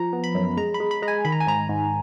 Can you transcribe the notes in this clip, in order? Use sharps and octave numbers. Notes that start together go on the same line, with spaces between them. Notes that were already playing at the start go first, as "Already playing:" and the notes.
Already playing: F3 A#5
B3
B5
F#2
G#3 A#5
B5
G#3
B5
G#3 A#5
G#5
D#3 B5
A#5
G#5
G#2 A#5
G#2